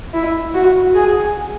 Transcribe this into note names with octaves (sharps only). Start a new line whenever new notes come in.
E4
F#4
G#4